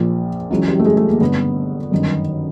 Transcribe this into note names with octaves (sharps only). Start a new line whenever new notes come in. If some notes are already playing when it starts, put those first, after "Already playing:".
Already playing: A#1 A#2 F3
C#2 C#3 E3 F#3
G3
A3
G#3
A3
A#3
G1 G2 D3 B3
G1 F#2 D#3